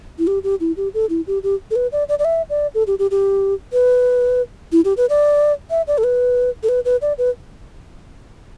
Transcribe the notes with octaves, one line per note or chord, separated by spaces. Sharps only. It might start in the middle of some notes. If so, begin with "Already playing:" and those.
E4
G4
G4
E4
G4
A4
E4
G4
G4
A4
B4
D5
D5
D5
E5
D5
A4
G4
G4
G4
B4
E4
G4
B4
D5
E5
D5
A4
B4
A4
B4
B4
D5
B4